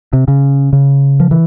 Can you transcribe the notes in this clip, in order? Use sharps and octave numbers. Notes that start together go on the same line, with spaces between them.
C3
C#3
C#3
F3
E3